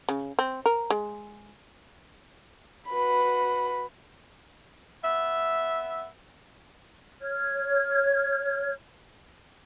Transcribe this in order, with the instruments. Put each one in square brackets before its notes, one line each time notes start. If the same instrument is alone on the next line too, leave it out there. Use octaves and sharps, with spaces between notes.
[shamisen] C#3
C4
A#4
G#3
[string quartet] F#4 B4 B5
[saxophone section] B3 E5
[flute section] C#5 F6 G#6